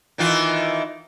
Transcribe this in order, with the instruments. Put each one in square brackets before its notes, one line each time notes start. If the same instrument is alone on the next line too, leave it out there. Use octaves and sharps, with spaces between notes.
[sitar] D#3 E3 F4